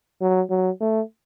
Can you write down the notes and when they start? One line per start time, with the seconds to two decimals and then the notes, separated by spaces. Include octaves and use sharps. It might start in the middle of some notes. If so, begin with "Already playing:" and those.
0.21 F#3
0.50 F#3
0.80 A3